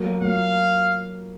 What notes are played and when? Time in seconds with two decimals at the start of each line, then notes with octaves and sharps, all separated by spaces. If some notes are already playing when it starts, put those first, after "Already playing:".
Already playing: F#3 A#3
0.21 F#3 A#3 F5